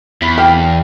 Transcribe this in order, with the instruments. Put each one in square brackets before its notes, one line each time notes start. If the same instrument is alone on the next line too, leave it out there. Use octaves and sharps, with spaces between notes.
[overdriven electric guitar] E2 [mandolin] B5
[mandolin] F5 [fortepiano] G5